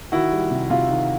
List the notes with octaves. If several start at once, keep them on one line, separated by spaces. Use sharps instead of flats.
D#3 E4 F#4
G3
C3
C3 F4
D#3